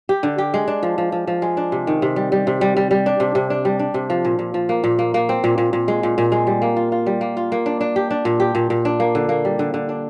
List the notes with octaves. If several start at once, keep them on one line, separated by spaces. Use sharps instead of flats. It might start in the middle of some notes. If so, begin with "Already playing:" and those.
G4
D3
G4
G#3
D4
F3
F3
F3
F3
G#3
D4
C3
D#3
C3
G3
G3
C3
G3
G3
G3
D4
C3
C3
D4
G3
D4
C3
F3
A#2
A#2
F3
A#3
A#2
A#3
A#3
C4
A#2
A#2
A#2
G#3
A#2
A#2
G#3
G3
A#3
F4
F4
G3
A#3
F4
A#3
D4
D4
G4
D4
A#2
G4
A#2
A#2
D4
A#3
D3
A#3
G3
D3
D3
D4